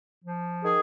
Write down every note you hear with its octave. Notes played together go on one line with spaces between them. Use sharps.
F3
D#3 G#4